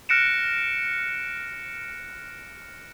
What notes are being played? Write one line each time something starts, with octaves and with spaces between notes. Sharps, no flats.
F6 F#6 A#6 C#7 D7 E7